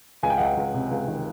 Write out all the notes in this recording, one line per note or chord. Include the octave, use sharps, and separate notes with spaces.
C#2 G#5
G5
C#2 F#5
G5
C#2
C3
C#2
D#3